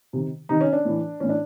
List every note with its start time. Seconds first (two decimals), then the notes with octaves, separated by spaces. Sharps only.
0.13 C3 D#3
0.49 C3 D#3 D#4
0.61 C#4
0.73 D4
0.85 A2 E3
1.20 A2 E3 C#4
1.29 D4